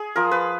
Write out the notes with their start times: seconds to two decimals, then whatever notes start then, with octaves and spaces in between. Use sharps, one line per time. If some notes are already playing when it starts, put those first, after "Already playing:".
Already playing: G#4
0.16 F3 A#4
0.31 B4